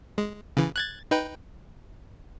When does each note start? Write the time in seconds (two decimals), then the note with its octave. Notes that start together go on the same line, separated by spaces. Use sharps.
0.18 G#3
0.57 C#3 E3
0.76 F#6 G#6 A6
1.11 D#4 B4 G5